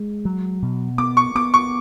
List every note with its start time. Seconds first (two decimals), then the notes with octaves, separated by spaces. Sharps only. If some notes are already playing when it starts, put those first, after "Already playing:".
Already playing: G#3
0.25 F#3
0.62 B2
0.98 B3 D6
1.17 C#6
1.35 B3 D6
1.54 C#6